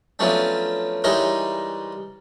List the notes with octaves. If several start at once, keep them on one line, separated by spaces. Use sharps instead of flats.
F3 F#3 A3 B3 C#4 D4
E3 G3 G#3 D#4 A#4 C#5